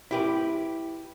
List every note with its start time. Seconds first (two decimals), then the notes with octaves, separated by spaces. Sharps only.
0.11 E4 G4 B4